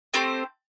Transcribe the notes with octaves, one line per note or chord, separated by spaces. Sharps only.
A3 C4 G4 C5